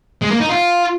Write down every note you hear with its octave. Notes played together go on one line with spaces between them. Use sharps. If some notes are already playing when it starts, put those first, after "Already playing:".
G#3
A#3
D#4
F4